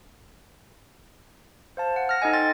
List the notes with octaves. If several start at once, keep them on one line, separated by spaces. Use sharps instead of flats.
C5 F5 A5
F#5
F6 A#6
D#4 A4 D#5 G#5
G5 C6 A6